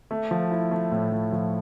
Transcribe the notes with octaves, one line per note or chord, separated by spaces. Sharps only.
A3
F3
E4
A3
A2
F3
F3